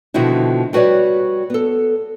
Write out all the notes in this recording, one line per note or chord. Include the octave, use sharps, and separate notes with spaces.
B2 D3 D#3 F3 E4 F#4
G3 F#4 B4 C#5 D5
B3 A4